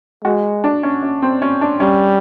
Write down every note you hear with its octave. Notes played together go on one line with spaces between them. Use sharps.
G#3 F#4
D4
C#4
C#4
C4
C#4
D4
G3 C#4